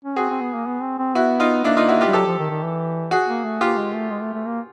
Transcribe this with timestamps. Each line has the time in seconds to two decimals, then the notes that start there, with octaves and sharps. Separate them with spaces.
0.05 C#4
0.16 C4 F#4 G#4
0.29 C4
0.41 B3
0.54 A#3
0.66 B3
0.82 C4
0.99 C4
1.15 B3 E4 F#4
1.40 D#4 F4
1.64 A#3 D4 E4
1.77 D#4 F4
1.88 E4 F#4
2.01 F4 G4
2.07 G3
2.13 F#3 G4 A4
2.26 F3
2.39 D#3
2.50 D#3
2.63 E3
3.11 F#4 G#4
3.28 A#3
3.44 A3
3.61 A#3 F4 G4
3.78 G#3
3.94 A3
4.11 G#3
4.22 A3
4.34 A3
4.47 A#3